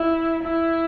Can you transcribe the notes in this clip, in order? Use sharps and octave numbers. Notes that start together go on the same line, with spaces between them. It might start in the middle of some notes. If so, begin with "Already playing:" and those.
Already playing: E4
E4